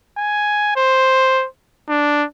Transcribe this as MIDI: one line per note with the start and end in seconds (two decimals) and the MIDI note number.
0.18 0.75 80
0.76 1.46 72
1.89 2.25 62